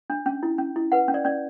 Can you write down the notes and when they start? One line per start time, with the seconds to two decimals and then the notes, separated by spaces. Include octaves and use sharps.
0.10 D4
0.26 C#4
0.43 E4
0.58 C#4
0.76 E4
0.92 B4 F#5
1.08 C#4
1.14 D5
1.25 C#4 D5